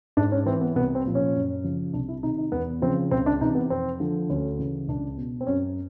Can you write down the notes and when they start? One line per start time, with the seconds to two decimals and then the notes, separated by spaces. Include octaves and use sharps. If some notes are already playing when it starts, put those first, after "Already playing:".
0.17 G#2 D4
0.32 C#4
0.46 E3 C4
0.61 B3
0.76 C2 B3
0.95 C4
1.05 A#2 F3
1.15 C#4
1.35 F#2
1.64 C#3 F3
1.93 C2 D4
2.08 E4
2.23 C3 D#3 D#4
2.38 D#4
2.52 E2 B3
2.82 C#3 F3 C4
3.11 C#2 C4
3.26 D4
3.41 C3 D#4
3.44 E3
3.55 B3
3.70 F2 C4
4.00 D3 F3
4.30 D2 C#4
4.59 C#3 E3
4.88 C#2 D4
5.17 B2
5.41 C4
5.47 F#2 C#4